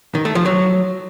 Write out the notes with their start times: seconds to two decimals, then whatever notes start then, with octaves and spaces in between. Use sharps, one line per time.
0.15 D#3
0.25 A3
0.35 F3
0.46 F#3